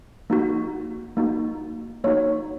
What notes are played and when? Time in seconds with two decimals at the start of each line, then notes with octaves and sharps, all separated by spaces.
0.30 A#3 D#4 F#4
1.17 A#3 D#4 F#4
2.04 A#3 D#4 F#4 C#5